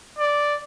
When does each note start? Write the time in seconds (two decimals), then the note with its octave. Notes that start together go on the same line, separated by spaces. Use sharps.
0.19 D5